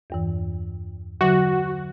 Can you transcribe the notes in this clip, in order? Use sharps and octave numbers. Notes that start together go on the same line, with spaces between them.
E2 G2 E3
D3 F#3 F#4